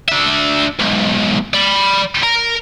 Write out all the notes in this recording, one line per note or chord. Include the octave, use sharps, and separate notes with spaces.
D4 E5
B1 G#2
D5 B5
A#4